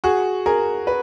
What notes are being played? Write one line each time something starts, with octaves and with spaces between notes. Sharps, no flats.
F#4 G#4
G#4 A#4
B4